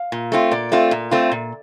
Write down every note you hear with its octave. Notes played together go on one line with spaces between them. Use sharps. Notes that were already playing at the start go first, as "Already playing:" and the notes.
Already playing: F5
A#2
A3 C4 F4
A#2 D5
A3 C4 F4
A#2
A3 C4 F4
A#2